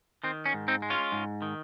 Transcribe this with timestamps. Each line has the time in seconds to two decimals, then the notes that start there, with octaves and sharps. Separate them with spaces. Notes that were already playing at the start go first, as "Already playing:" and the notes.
0.24 D#3 C4
0.46 C#4
0.54 G#2
0.68 C4 D#4
0.82 G#3
0.90 C#4 F4
1.12 G#2
1.42 D#3